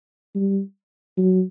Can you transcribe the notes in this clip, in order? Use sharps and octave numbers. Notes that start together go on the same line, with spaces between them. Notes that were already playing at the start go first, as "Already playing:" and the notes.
G3
F#3